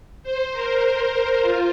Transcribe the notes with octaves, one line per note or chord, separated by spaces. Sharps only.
C5
A#4
F4